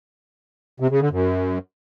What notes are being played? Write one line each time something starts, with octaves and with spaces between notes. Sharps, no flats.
C3
C#3
D3
F#2